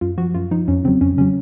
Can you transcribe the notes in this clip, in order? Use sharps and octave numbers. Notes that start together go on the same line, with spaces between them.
F#2 F4
F3 F#4
F#2 F4
F3 D#4
F2 C#4
C#3 F#3 C4
F2 C#4
C#3 F#3 C#4